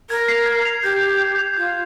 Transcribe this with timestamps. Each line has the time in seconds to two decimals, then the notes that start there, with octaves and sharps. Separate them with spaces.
0.10 A#4 G#6
0.28 C7 F7
0.46 G#6
0.65 C7 F7
0.83 G4 G6
1.01 C7 F7
1.19 G6
1.38 C7 F7
1.57 F4 G6